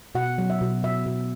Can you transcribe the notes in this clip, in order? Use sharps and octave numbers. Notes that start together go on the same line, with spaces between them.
B2 F#5
F#3
E5
B2
B2 E5
B2